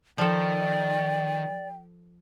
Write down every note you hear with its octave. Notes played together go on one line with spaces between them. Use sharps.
D#3 F3 A4 D5 G5